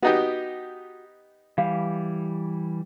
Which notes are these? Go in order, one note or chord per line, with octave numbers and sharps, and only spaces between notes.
B3 D#4 F#4 G4
E3 G3 F5